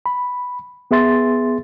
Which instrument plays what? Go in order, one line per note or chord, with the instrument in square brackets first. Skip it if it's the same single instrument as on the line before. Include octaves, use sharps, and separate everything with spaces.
[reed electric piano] B5
B3 G#4 E5 C6 A6